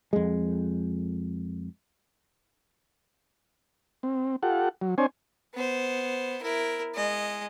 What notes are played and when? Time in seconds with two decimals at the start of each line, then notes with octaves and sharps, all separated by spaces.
0.13 F2 G#3
4.03 C4
4.43 F4 G4 A4 F#5
4.81 F#3
4.98 C4 D4 C5 C#5 G#5
5.54 B3 C5
6.42 E4 A#4
6.95 G#3 D#5